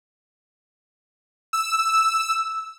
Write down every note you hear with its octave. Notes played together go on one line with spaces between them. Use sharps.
E6